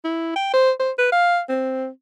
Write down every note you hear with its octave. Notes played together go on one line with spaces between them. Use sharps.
E4
G5
C5
C5
B4
F5
C4